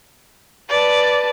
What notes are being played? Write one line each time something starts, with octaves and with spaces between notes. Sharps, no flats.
B4 D5 A5